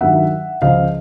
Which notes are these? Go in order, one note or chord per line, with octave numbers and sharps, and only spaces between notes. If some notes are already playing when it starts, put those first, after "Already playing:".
G2 D#3 F#3 E5 F#5
C#2 C#3 F3 D#5 F5